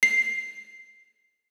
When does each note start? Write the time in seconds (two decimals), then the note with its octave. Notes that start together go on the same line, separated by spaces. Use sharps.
0.03 C7